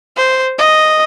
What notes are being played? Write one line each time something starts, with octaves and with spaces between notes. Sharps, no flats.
C5
D#5